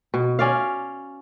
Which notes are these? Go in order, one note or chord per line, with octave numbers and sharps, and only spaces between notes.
B2
C#4 D5 F5